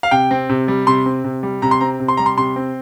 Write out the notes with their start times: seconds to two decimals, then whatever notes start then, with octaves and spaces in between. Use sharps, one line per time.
0.03 F5
0.11 C3 G5
0.31 C4
0.49 C3
0.68 G3
0.87 C3 C6
1.06 C4
1.24 C3
1.43 G3
1.62 C3 A#5
1.71 C6
1.81 C4 A#5
2.00 C3
2.08 C6
2.17 G3 A#5
2.26 C6
2.37 C3 C6
2.56 C4